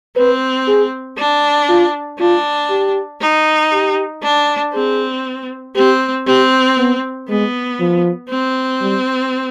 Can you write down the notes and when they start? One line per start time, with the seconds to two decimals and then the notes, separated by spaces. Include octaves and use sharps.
0.16 C4 B4
0.67 G#4
1.18 D4
1.69 F4
2.19 D4 F4
2.70 G4
3.21 D#4
3.72 G4
4.23 D4
4.73 C4 G#4
5.75 C4 G4
6.27 C4 G4
6.78 B3
7.29 G#3 B3
7.80 F3
8.30 C4
8.81 G3